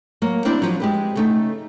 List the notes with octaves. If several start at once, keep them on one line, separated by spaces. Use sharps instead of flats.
F#3 A#3
A#3 C4 D4 E4 C5 D5
F3 F#3
G#3 G4 B4
C#3 A3 D#4